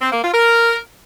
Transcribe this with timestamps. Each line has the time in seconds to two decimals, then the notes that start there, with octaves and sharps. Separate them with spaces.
0.01 C4
0.12 A#3
0.23 F4
0.33 A#4